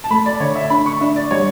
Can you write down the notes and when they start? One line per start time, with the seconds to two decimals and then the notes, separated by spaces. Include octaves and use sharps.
0.04 A5
0.11 A3 B5
0.26 D5
0.40 D3 C#5
0.55 E5
0.70 D4 B5
0.86 C#6
1.01 D4 E5
1.16 D5
1.31 G3 C#5